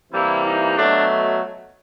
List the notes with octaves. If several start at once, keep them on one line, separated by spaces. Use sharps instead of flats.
C3 E3 G3 A#3 E4
D#4
B2 F#3 A3 D4